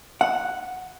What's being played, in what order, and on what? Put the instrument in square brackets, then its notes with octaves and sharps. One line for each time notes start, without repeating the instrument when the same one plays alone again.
[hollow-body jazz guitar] F#5